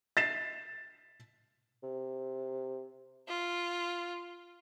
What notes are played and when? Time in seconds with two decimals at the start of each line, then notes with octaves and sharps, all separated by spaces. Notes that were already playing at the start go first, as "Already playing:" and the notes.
0.17 A6 B6 C7 E7
1.83 C3
3.28 F4